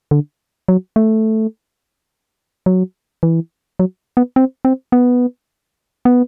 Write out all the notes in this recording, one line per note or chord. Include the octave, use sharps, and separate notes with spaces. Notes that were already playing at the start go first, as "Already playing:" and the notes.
D3
F#3
A3
F#3
E3
F#3
B3
C4
C4
B3
B3